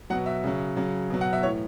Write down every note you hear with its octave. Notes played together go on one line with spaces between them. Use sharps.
B2 F#3 F#5
E5
C#3 F#3
C#3 F#3
B2 F#3
F#5
E5
A2 E3 C#5